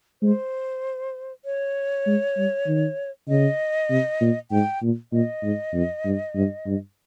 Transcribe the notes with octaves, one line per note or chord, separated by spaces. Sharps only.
G#3 C5
C#5
G#3
G3
D#3
C#3 D#5
C3
A#2
G#2 G5
A#2
A#2 D#5
G#2
F2
G2
G2
G2